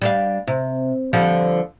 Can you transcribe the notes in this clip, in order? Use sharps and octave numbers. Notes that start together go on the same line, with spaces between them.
G3 D4 F5
C3
D3 F3 G3